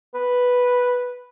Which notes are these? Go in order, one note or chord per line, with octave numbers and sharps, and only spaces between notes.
B4